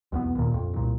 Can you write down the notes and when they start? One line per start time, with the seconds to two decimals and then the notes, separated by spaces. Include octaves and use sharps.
0.12 B1 E2 B3
0.35 D#2 A#2
0.52 A#1 F2
0.74 C2 A#2